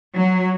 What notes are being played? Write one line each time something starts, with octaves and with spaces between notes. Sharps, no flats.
F#3